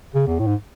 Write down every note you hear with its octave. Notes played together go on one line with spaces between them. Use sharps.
C#3
E2
A2
G#2